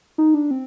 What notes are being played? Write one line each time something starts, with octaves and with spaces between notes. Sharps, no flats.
D#4
D4
C4